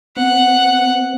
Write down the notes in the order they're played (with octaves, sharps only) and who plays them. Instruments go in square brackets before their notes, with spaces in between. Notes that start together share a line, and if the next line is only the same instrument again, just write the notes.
[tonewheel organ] B3 C4 [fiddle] F#5